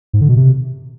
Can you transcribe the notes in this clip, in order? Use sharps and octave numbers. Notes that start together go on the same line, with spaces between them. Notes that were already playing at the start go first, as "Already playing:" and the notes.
G#2
D3
B2
C3